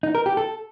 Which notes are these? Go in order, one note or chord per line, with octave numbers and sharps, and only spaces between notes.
D#4
A#4
G4
A4